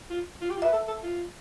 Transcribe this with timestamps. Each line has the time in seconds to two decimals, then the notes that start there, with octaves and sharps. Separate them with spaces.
0.10 F4
0.41 F4
0.50 G4
0.57 F4
0.62 B4 E5
0.73 A4
0.88 A4
1.03 F4